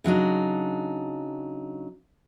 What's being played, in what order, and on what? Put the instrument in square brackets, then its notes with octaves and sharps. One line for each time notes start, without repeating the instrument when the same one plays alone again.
[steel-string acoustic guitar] C#3 F#3 D4 D#4